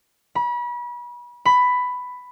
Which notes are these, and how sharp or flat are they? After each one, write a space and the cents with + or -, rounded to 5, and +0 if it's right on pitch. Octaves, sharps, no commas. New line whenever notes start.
B5 -35
B5 +10